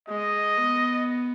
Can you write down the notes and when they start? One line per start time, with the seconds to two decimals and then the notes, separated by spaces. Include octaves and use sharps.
0.08 G#3 D#5
0.58 B3